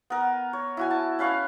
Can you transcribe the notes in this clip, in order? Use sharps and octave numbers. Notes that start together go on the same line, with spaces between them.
B3 A#4
C#5
E4 F#4 G#5
A5
C#4 B4 F5 C#6